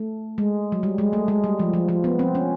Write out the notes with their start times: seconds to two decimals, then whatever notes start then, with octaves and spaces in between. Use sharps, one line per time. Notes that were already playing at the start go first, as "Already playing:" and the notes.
Already playing: A3
0.38 G#3
0.72 F#3
0.83 G3
0.98 G#3
1.13 A3
1.28 G#3
1.44 G3
1.60 F3
1.74 F3
1.89 F3
2.04 B3
2.19 C4
2.35 C#4